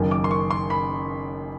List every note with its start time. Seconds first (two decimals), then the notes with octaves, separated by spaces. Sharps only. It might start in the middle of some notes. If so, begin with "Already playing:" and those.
Already playing: F#1 F#2 D#3
0.11 D6
0.24 C6
0.31 C#6
0.51 C6
0.70 B5